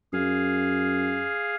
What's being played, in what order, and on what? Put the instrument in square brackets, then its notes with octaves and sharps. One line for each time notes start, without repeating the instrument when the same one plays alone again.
[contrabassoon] F#2 [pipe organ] G#4 F5